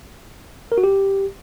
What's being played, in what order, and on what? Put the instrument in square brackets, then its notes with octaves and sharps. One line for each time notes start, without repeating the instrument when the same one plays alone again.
[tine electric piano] A#4
F#4
G4